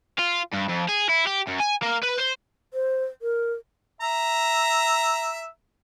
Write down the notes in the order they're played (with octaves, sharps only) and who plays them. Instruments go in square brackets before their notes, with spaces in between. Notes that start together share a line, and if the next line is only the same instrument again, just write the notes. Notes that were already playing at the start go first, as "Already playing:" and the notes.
[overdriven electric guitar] F4
G2
F2
G#4
E4
G4
F#2
G#5
A#3
B4
C5
[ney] C5
A#4
[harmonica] E5 A#5